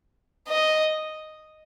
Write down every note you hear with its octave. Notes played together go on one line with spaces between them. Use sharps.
D#5